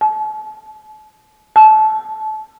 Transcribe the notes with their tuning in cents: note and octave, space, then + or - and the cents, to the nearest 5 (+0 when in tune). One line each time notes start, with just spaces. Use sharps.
A5 -40
A5 -25